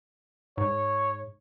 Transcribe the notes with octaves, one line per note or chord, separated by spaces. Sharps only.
G#2 C#5